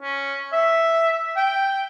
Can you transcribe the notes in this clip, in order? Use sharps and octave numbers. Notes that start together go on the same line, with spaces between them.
C#4
E5
G5